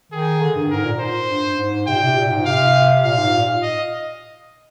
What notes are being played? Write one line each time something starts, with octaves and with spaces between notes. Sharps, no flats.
D#3 G#4
D3
G2
G#2 A#4
A#2
C5
G2
G2
G#2
C3 G5
A#2
C3
A#2
G#2
C3 F5
A#2 F5
G#2
A#2
D#5